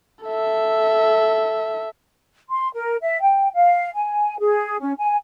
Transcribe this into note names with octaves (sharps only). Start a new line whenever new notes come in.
A4 E5
C6
A#4
E5
G5
F5
G#5
G#4
C#4
G#5